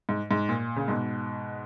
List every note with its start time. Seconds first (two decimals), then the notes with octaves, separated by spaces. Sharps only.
0.09 G#2
0.31 G#2
0.49 A#2
0.76 C#3
0.88 G#2 B2